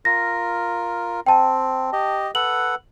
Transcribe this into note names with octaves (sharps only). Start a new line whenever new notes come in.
F4 A#4 A#6
C4 G5 A5
G4 D#5
A4 B4 F#5 F#7